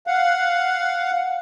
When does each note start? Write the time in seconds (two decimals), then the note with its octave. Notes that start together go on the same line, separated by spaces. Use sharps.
0.07 F5 F#5